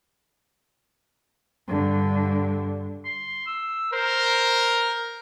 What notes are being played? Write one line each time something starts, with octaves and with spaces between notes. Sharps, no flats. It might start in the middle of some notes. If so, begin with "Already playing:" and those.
G2 D3
C6
E6
A#4 C5